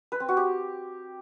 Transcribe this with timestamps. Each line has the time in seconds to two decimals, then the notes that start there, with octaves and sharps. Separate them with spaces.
0.12 B4
0.20 C4
0.29 F#4
0.37 G4